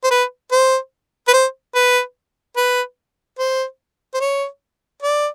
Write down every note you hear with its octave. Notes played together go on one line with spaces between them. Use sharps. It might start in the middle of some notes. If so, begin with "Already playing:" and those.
C5
B4
C5
B4
C5
B4
B4
C5
C5
C#5
D5